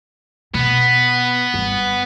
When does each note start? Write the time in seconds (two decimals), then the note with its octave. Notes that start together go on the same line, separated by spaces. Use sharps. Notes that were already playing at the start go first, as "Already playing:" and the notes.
0.54 B2 B3
1.54 G1 G2